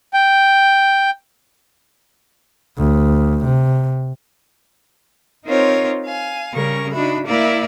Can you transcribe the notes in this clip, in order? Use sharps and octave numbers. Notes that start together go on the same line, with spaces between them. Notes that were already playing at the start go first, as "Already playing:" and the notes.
G5
D2
C3
C4 D#4 F4 A#4 C5 C#5
F5 G#5
C#3 G3 C#4 A#4 C#6
D4 D#4 F#4 E5 B5
A#3 E4 A#4 D5 E5 F5